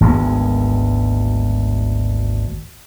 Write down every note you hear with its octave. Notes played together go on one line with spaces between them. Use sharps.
G#1 D2 G#3 B3